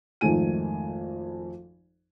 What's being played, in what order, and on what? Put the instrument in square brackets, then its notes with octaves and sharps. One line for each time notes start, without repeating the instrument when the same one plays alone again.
[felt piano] G#1 F2 D#3 A3 G#5 D#7